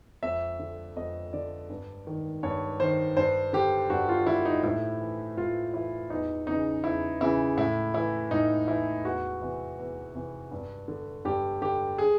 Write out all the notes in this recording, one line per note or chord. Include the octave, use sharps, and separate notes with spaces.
F2 E5
D3
F2 D#5
D3 D5
G2
D#3
G2 C#5
D#3 C5
G2 C5
D3 G4
G2 F#4
F4
D3 E4
D#4
A2 E4
E3
A2 F4
E3 E4
E2 D#4
C#3 E3 D#4
E2 E4
C#3 E3 E4
A2 E4
E3 E4
A2 D#4
E3 E4
E2 F#4
C3 E3
E2
C3 E3
G2
D3
G2 G4
D3 G4
G#4